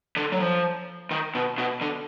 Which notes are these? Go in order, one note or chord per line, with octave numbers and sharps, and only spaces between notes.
D3
F#3
F3
D#3
B2
B2
D3